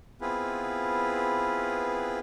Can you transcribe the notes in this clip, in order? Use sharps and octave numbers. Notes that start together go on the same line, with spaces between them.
B3 C4 E4 F4 G#4 B4